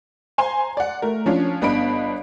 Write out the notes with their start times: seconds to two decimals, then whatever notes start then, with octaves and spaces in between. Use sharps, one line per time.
0.38 C5 G#5 A#5 C6
0.77 D5 F#5
1.02 A3 A#4
1.26 F3 C#4 D4 F4
1.62 G1 B3 D4 D#5 B5 D7